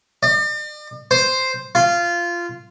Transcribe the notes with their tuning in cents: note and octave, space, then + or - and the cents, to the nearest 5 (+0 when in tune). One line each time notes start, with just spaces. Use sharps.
D5 +40
C5 +0
F4 -15